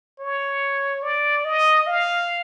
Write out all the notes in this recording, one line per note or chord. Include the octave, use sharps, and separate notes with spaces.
C#5
D5
D#5
F5